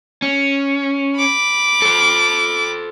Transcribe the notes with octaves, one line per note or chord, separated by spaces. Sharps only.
C#4
B5 D6
A4 C5